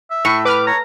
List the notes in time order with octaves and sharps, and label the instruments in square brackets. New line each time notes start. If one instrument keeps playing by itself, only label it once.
[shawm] E5
[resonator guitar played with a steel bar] A2 [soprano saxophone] C#6
[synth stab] B4 F6 [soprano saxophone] D6
[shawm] C#5 [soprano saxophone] A#5